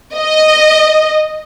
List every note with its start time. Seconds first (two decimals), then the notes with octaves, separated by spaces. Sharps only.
0.15 D#5